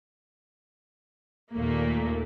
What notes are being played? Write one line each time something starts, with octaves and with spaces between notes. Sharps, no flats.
D#2 A#2 A3 A#3